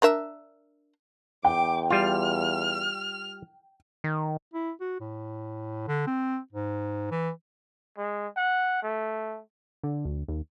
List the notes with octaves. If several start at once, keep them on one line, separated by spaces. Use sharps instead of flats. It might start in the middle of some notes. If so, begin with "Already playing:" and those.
D4 A#4 E5
E2 G5 D6
G3 F4 F6
D#3
E4
F#4
A2
D3
C4
G#2
E3
G#3
F#5
A3
D3
D2
D#2